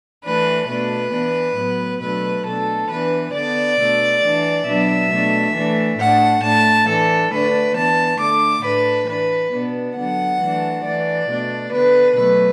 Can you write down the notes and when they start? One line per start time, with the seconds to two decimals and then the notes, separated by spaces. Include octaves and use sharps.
0.24 E3 A3 D4 B4
0.69 B2 A3 D4 B4
1.13 E3 B3 D4
1.57 A2 F#3 B3
2.01 B2 F#3 A3 D4 B4
2.46 B2 A3 D4 A4
2.90 E3 B3 D4 B4
3.33 D3 B3 D4 D5
3.78 B2 A3 D4
4.22 E3 D4
4.66 B2 F#3 B3 D4 E5
5.10 B2 A3 D4
5.54 E3 A3 D4
5.99 A2 A3 D4 F#5
6.43 A2 A3 D4 A5
6.88 E3 D4 A4
7.31 D3 A3 D4 B4
7.76 E3 B3 D4 A5
8.20 D3 A3 D4 D6
8.64 A2 A3 D4 B4
9.08 E3 D4 B4
9.52 B2 B3 D4
9.97 D3 F#3 B3 D4 F#5
10.40 E3 A3 D4
10.84 E3 A3 D4 D5
11.30 B2 A3 D4
11.73 D3 B3 D4 B4
12.17 B2 F#3 A3 B4